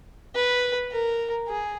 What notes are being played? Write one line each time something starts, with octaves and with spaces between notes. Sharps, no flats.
B4
A#4
G#4